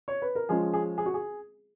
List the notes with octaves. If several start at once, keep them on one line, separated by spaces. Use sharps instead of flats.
C#5
B4
A#4
F3 G#3 C#4 G#4
G#4
G#4
F#4
G#4